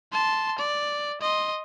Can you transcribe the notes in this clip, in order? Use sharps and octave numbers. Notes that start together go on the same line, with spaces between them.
A5 C6
D5
D#5 C6